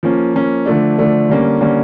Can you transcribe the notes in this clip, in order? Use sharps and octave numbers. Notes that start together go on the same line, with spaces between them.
F3 A#3 C#4
F3 A#3 C#4
D3 F3 A3 D4
D3 F3 A3 D4
D3 G3 A#3 C#4
D3 G3 A#3 C#4